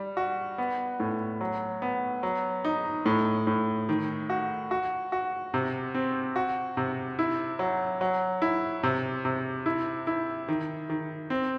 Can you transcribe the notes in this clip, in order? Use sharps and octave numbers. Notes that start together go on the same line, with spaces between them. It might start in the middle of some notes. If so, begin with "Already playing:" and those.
Already playing: G3
F#4
B3
A2
F#3
B3
F#3
D#4
A2
A2
D#3
F#4
F#4
F#4
C3
C4
F#4
C3
E4
F#3
F#3
E4
C3
C3
E4
E4
D#3
D#3
C4